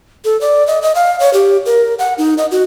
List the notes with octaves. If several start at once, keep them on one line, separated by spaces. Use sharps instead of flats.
A4
D5
D#5
D#5
F5
C#5
G4
A#4
F#5
D#4
D#5
F#4